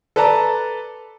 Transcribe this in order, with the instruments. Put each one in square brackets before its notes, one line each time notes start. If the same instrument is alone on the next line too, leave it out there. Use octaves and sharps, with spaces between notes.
[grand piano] A4 B4 D5 A5 A#5